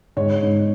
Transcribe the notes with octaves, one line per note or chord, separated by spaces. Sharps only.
G#2 C#5
G#2